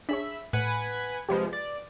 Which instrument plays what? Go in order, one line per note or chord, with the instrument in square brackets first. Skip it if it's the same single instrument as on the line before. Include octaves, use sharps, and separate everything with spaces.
[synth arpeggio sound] D4 G#4 C#5 [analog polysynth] E5 B5
[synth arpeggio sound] A2 [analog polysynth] B4 F#5 G#5
[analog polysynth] C3 F3 G#3 [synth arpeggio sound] G4 B4
[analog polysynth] D5